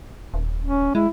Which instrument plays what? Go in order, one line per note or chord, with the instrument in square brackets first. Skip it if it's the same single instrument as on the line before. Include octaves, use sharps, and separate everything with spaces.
[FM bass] D#1
[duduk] C#4
[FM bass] G#3 [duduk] E4